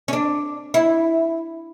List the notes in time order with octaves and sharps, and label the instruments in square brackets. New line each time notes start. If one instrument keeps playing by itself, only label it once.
[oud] C#4
D4
E4